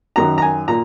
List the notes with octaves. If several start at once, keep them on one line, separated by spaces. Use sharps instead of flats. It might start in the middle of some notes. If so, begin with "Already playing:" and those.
F#2 D#3 F#3 A#5
A#5
G#5
A#2 A#5